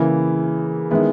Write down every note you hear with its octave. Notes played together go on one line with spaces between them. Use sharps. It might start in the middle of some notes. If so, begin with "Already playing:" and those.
Already playing: C#3 E3 A#3 E4
D#3 G#3 B3 E4